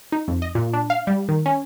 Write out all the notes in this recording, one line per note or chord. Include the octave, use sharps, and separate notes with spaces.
D#4
F2
D#5
A#2
D4
F5
G3
D#3
C#4